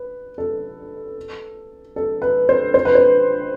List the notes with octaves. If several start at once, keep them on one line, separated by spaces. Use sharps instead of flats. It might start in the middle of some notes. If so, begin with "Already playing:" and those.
Already playing: B4
A4
A4
B4
C5
C5
B4
C5